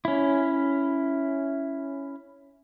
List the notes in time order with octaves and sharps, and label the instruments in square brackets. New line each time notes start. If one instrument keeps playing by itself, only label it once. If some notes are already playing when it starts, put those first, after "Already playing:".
[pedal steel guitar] C#4 E4